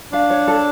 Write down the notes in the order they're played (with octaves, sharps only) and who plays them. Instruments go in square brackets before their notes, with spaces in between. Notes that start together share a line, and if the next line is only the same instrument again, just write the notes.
[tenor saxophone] D4 [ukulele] F5
[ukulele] C#5
A4